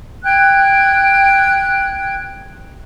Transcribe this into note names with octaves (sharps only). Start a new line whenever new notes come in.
G5 F#6 G#6